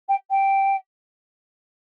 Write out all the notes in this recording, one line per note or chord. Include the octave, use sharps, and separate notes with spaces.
G5
G5